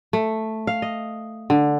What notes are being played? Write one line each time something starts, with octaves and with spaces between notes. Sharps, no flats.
A3
F5
D#5
D3